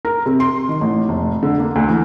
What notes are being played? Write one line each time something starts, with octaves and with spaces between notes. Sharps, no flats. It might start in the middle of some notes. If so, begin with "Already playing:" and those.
A#4
C3
C6
D#3
A1
F1
D3
A#3
D2
E3